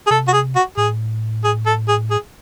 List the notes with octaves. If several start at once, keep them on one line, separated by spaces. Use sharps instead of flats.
G#4
C3 A4
F#4
G#4
F#4
A2 G#4
G#4
A4
G#4
G#4